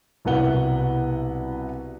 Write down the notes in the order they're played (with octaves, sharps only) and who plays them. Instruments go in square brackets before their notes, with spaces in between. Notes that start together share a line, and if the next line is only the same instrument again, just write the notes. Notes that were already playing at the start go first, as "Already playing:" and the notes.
[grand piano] C2 B2 E4 B4 F#5 G7